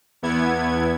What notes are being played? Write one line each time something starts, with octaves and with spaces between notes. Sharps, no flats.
E2 B3 E4 G#6